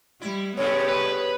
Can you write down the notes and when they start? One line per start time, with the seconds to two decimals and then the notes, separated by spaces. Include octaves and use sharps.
0.22 G3 E4
0.57 G2 C3 A3 B3 G4 G#4 C#5
0.89 B4